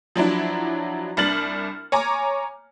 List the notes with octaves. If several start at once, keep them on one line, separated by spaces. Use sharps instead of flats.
F3 F#3 D4 E4
C2 D4 F6 A6 F#7
C#5 G#5 A#5 D6